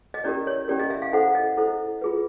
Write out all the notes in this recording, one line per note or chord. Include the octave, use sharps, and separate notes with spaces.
D#5
C#4 E4 G4 A#4 D5
C#5
C#4 E4 G4 A#4 D5
D#5
E5
F5
E4 A4 C5 F#5
D#5
E4 A4 C5
F4 G#4 B4